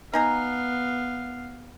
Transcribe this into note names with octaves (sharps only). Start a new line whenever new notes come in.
B3 D#4 F5 G#5 A#5